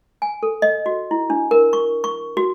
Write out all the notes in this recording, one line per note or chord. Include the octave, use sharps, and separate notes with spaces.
G#5
A4
D#5
F#4
E4
D4
A#4
C#6
C#6
F#4